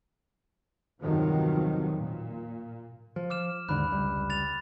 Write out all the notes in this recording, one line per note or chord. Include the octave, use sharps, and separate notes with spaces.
E2 G2 C3 D#3 F3 F#3
A#2
F3
D6 F6 E7
D#2 G#2 D3 B5 F#6
F1 C#2 G3
A6 F7